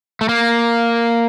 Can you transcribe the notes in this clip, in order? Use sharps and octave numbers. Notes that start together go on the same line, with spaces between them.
A3
A#3